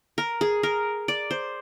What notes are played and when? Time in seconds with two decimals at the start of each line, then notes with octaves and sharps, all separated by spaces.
0.18 A#4
0.41 G#4
0.63 A#4
1.08 D5
1.31 C5